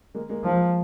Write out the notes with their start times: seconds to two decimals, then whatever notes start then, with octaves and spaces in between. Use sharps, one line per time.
0.15 G#3 A#3
0.29 G#3 A#3
0.44 F3